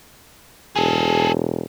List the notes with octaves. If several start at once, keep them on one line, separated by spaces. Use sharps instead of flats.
E1 G#4 A4